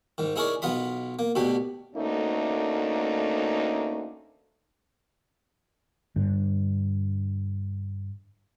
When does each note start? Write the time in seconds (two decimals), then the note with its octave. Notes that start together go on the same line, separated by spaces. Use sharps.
0.18 G#2 D#3
0.36 D#4 E4 G#4 A#4 C#5 D5
0.62 B1 B3 F4 D#5 B5
1.19 A#3
1.35 D2 B2 D4 G4 B5
1.95 D2 A3 A#3 C#4 D#4
6.16 G2 D3